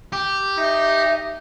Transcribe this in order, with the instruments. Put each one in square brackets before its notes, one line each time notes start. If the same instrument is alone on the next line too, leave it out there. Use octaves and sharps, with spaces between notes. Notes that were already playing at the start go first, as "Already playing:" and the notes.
[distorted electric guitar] G4
[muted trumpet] D#4 [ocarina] E5